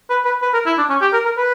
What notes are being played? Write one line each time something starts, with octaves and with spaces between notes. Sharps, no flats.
B4
B4
B4
A#4
E4
D4
C#4
G4
A#4
A#4
B4